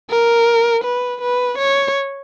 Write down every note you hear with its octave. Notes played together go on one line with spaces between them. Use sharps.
A#4
B4
B4
C#5